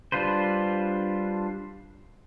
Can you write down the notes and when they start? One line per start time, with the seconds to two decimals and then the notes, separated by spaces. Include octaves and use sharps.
0.12 G3 D4 F4 B4 C5